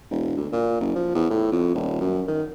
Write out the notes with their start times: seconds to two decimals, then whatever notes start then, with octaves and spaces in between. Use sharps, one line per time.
0.11 E1
0.37 D2
0.52 A#2
0.80 F#1
0.95 F3
1.15 E2
1.30 A2
1.52 F2
1.75 D#1
2.01 F#2
2.28 D#3